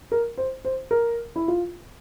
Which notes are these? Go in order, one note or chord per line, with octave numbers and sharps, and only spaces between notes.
A#4
C5
C5
A#4
E4
F4